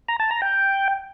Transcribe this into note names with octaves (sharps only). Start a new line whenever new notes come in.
A#5
A5
A#5
G5